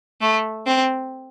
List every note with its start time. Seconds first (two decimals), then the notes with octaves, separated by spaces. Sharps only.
0.21 A3
0.66 C4